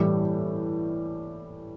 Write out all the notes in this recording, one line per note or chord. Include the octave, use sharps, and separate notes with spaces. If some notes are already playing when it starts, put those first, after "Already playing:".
Already playing: A2 E3 G3